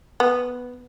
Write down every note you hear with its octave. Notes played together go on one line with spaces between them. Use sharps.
B3